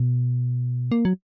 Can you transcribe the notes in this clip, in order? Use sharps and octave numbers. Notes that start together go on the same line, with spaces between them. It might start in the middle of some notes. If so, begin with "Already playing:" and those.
Already playing: B2
A#3
F#3